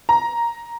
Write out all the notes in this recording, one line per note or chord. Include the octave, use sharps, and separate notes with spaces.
A#5